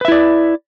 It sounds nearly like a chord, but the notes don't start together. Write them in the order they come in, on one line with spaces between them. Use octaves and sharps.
B4 E5 E4 D5